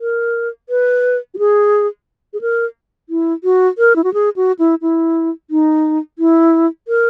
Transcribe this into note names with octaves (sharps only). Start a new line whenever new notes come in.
A#4
B4
F#4
G#4
G#4
A#4
E4
F#4
A#4
E4
F#4
G#4
F#4
E4
E4
D#4
E4
A#4